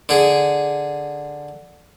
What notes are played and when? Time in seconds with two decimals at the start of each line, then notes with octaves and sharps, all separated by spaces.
0.09 D3 G#4